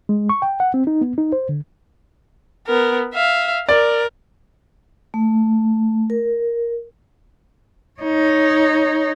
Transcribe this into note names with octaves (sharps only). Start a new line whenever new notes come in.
G#3
C#6
G5
F#5
C4
D#4
B3
D#4
C5
D3
B3 A#4
E5 F5
A#4 D5
A3
A#4
D#4 C#5